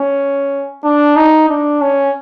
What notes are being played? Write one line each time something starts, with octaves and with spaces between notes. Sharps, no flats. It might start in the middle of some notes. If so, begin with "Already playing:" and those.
Already playing: C#4
D4
D#4
D4
C#4